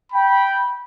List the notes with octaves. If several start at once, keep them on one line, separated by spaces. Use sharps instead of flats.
G5 B5